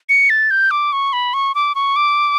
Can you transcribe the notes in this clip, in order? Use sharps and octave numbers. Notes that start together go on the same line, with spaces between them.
C#7
A6
G6
D6
C#6
B5
C#6
D6
C#6
D6